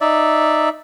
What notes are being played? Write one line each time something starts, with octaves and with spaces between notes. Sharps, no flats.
D#4 D5 E5